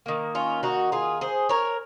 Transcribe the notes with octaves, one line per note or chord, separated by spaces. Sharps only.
D#3 A#3
C#4 F4
D#4 F#4
F4 G#4
G#4 C5
A#4 C#5